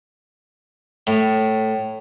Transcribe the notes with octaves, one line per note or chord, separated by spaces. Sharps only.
A2